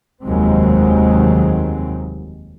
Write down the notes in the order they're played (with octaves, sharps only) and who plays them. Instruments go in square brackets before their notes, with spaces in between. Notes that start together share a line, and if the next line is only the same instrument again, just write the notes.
[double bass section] F1 D#2 D#3 F#3 G#3 C4